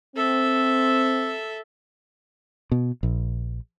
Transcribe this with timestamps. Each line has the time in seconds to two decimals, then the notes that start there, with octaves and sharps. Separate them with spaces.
0.16 C4 A4 E5
2.72 B2
3.03 A#1